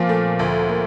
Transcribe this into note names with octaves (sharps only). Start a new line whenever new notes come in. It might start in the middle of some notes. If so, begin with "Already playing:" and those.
Already playing: A#2 F3 F4
A3
D2
A#3